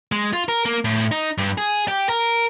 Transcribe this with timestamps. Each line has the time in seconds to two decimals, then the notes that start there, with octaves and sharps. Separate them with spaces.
0.12 G#3
0.33 F4
0.49 A#4
0.65 A#3
0.85 A2
1.11 D#4
1.38 G2
1.58 G#4
1.88 G4
2.09 A#4